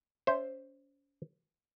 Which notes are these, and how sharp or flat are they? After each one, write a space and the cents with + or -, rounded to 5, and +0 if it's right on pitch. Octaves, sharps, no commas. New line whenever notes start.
C#4 +30 C5 +0 E5 +0